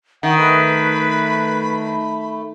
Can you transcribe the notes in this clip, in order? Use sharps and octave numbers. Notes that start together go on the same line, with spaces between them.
D#3 F#5
A3 B4 B5